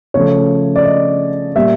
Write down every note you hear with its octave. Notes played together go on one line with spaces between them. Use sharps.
C#3 F3 A3 C#5
D5
D#5
A#2 G3 E5